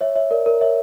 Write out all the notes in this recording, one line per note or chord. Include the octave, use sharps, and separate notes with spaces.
C#5 E5
C#5 E5
A#4 D5
A#4
C#5 E5